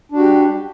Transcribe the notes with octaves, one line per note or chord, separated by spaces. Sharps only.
G3 D4 F#4 G4